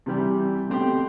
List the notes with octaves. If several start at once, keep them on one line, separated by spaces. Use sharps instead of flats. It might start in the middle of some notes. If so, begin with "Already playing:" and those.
C3 E3 G3
B2 A3 C4 G4